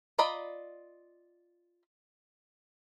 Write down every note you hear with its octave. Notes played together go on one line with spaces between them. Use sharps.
F4 D5 D#5 A#5 B5